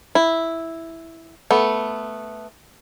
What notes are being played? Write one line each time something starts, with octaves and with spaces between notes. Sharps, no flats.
E4
A3 B3